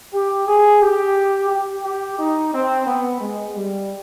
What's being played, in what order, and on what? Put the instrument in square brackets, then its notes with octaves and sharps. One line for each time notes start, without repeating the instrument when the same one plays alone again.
[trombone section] G4
G#4
G4
G4
G4
D#4
C4
B3
G#3
G3